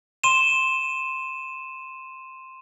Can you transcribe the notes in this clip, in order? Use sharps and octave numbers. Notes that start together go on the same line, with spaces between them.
C6 D#7 E7